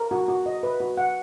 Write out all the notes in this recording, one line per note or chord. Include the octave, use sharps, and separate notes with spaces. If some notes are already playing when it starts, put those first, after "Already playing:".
Already playing: A#4
F#4
F#4
D#5
B4
F#4
F#5